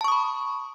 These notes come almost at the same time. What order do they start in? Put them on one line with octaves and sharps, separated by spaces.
A5 C#6 D#6 B5